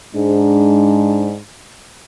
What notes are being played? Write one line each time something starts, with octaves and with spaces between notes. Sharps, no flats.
G#2 G#3 D4